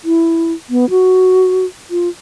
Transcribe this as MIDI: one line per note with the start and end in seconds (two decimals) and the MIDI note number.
0.05 0.53 64
0.70 0.89 59
0.90 1.65 66
1.91 2.08 65